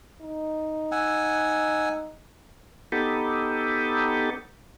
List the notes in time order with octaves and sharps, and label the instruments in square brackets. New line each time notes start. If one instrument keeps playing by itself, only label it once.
[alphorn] D#4
[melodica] F#5 G#5 E6
[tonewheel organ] B3 D#4 G4 A4